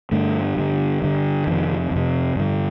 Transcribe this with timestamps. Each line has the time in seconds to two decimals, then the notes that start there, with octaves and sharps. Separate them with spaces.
0.11 G2 D3 A3
0.57 G2 D3
1.02 G2 D3
1.47 F2 C3 D#3
1.91 F2 C3
2.36 G2 D3